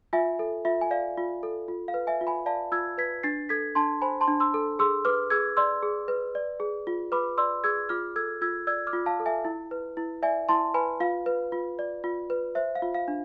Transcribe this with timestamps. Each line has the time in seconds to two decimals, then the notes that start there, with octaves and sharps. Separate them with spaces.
0.13 F4 E5 G#5
0.39 A4
0.65 F4 E5
0.81 G#5
0.91 D5 F5
1.18 F4
1.43 A4
1.68 F4
1.88 F5
1.94 B4
2.07 E5 G#5
2.21 F4
2.27 G#5 B5
2.46 D5 F5 A5
2.72 F4 E6 G#6
2.98 B4 G#6 B6
3.23 D4 A6 C7
3.49 A4 G#6 B6
3.75 D4 A5 C6
4.02 C5 G#5 B5
4.21 A5 C6
4.28 D4
4.40 C6 E6
4.54 A4
4.79 G#4 C6 E6
5.05 B4 D6 F6
5.30 G#4 E6 G#6
5.57 D5 C6 E6
5.83 G#4
6.08 B4
6.35 D5
6.60 G#4
6.87 F4
7.12 B4 B5 D6
7.38 D5 C6 E6
7.64 G#4 E6 G#6
7.89 F4 D6 F6
8.16 A4 E6 G#6
8.41 F4 E6 G#6
8.67 D5 E6 G#6
8.87 D6 F6
8.93 F4
9.06 F5 A5
9.20 A4
9.26 E5 G#5
9.45 E4
9.71 B4
9.97 E4
10.23 D5 E5 G#5
10.49 E4 A5 C6
10.74 B4 G#5 B5
11.00 F4 F5
11.26 B4
11.52 F4
11.79 D5
12.04 F4
12.30 B4
12.55 C5 E5
12.75 F5
12.82 F4
12.95 F5
13.08 D4